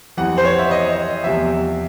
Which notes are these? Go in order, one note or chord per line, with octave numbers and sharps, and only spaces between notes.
F2 C3 E3 F#5
C5
C#5
E5
D#5
E2 C3 F3 E5